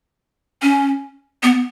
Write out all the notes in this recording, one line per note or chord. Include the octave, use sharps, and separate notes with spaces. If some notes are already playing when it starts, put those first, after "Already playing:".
C#4
B3